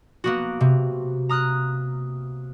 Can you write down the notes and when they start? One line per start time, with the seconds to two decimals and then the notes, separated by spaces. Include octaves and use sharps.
0.24 A#3 B3 F#4
0.60 C3
1.29 A#5 D#6 F6 F#6